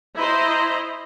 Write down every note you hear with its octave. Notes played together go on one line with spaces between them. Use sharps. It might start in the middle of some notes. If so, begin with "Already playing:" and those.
E4 C5 D#5 A#5